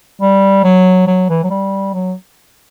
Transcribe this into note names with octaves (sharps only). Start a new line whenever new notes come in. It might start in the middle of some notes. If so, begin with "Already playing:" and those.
G3
F#3
F#3
E3
F#3
G3
F#3